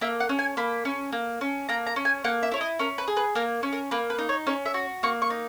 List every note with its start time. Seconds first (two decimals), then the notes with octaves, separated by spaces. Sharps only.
0.01 A#3 E5
0.20 F#5
0.29 C#4
0.39 G#5
0.57 A#3 B5
0.85 C#4
1.12 A#3
1.41 C#4
1.69 A#3 A#5
1.87 A#5
1.96 C#4
2.05 G#5
2.24 A#3 F#5
2.43 E5
2.51 E4 C#5
2.61 D#5
2.79 C#4 A#4
2.98 B4
3.08 G#4
3.17 B4
3.35 A#3 A#4
3.63 C#4
3.73 A#4
3.91 A#3 B4
4.10 B4
4.19 D#4
4.29 C#5
4.47 C#4 C#5
4.66 E5
4.74 F#4
5.03 A#3 C#6
5.22 C#6
5.30 D#4